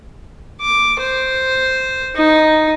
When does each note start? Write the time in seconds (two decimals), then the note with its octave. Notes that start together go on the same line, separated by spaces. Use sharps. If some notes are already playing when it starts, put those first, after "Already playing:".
0.61 D6
1.00 C5
2.16 D#4